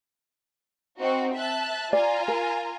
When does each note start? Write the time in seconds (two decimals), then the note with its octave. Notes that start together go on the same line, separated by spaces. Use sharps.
1.01 C4 D#4 F#4
1.34 E5 A5 F#6
1.93 F4 D5 G#5 A#5
2.28 A#4